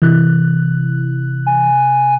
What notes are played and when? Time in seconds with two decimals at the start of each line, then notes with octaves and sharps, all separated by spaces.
0.02 C3 E3 F#6
1.46 G#5